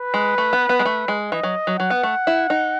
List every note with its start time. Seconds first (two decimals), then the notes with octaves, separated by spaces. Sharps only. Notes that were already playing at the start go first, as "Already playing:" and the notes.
Already playing: B4
0.14 G#3
0.38 A3
0.53 B3
0.69 B3
0.79 G#3
0.85 A3
1.08 G#3
1.32 E3 D#5
1.43 F#3
1.67 F#3
1.79 F#3 F#5
1.90 B3
2.03 A3
2.27 E4
2.50 D#4